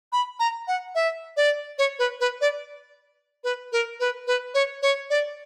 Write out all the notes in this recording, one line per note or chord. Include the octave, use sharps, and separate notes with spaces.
B5
A#5
F#5
E5
D5
C#5
B4
B4
D5
B4
A#4
B4
B4
C#5
C#5
D5